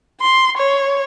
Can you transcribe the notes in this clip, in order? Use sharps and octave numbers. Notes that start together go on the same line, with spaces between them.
C6
C#5